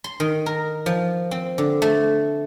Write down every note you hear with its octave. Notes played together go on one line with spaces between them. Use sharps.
C6
D#3
A#4
F3
C4
D3
A3